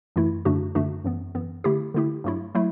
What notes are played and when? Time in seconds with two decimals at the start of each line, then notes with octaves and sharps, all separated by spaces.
0.16 F#2 E3 A3 E4
0.45 F#2 D3 A3 D4 F#4
0.75 F#2 D3 A3 D4 F#4
1.04 F#2 E3 B3
1.35 F#2 E3 B3
1.64 D3 A3 E4 G4
1.94 D3 A3 E4 G4
2.24 G2 F#3 A3 E4
2.55 F#3 A3 E4